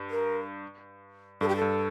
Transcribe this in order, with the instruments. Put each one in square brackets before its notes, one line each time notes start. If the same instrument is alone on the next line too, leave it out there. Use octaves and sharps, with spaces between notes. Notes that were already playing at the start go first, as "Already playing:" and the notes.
Already playing: [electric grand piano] G2
[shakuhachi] A#4
[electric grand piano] G2 [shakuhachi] A4
[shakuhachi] G4
A4
[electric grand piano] G2